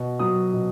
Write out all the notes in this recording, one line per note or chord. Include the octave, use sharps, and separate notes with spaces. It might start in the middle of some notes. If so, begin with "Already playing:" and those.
Already playing: B2
F#3 D#6
B2